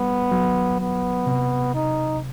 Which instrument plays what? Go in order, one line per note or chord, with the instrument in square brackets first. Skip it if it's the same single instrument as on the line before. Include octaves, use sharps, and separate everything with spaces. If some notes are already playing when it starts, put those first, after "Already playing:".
Already playing: [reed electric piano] G3 [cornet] B3
[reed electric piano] F#3
[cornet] B3
[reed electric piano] C3
[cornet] D#4